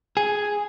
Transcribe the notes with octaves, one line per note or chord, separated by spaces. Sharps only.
G#4